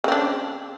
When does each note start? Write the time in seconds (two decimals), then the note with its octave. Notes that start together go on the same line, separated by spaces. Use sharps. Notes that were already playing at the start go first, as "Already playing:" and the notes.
0.04 C#3
0.08 C4
0.12 D4